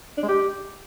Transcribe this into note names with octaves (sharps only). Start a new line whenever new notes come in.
D4
G#3
G4